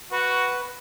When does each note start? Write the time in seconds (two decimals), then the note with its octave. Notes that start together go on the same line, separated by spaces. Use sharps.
0.12 F#4 B4